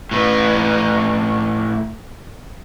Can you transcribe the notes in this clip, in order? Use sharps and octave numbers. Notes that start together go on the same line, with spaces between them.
A2 B4